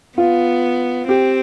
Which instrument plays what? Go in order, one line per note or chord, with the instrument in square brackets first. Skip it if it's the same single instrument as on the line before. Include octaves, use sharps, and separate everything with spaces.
[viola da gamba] B3 [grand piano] F4
[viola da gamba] C4 [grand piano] G4